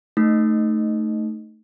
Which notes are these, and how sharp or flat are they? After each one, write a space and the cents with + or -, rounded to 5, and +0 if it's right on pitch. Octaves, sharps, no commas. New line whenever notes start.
A3 +0 D#4 -5